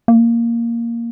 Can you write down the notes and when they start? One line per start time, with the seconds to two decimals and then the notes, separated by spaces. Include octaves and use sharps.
0.08 A#3